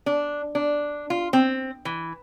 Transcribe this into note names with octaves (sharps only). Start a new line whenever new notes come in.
D4
D4
F4
C4
E3